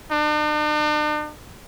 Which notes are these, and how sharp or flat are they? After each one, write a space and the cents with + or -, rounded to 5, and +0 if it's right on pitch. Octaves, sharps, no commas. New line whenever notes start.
D4 +45